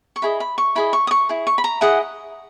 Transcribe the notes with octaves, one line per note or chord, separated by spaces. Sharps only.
C#6
E4 G#4 D#5 B5
B5
C#6
E4 G#4 D#5 B5
C#6
D#6
C#6
E4 G#4
C#6
B5
A#5
E4 G#4 D#5 F#5